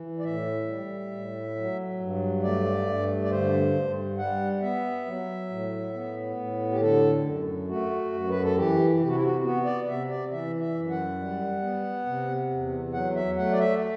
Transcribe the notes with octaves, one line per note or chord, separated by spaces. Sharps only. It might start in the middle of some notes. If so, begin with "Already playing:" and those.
Already playing: E3
D5
A2 E5
G3
A2
F#3
G2
A3 D5
G2
D5
D3 C5
G2
G3 F#5
B3 E5
F#3
A2
B3
A2
G4
D3 A4
F#2
A3 F#4
F#2
B4
A4
E3 G4
C3 G4
F#4
E4
F#4
B3 F#4
D5
C3 E5
D5
E3 E5
E5
F#2
F#5
G3
B3
C3
E2
F#3 F#5
E5
A3 F#5
D5
E5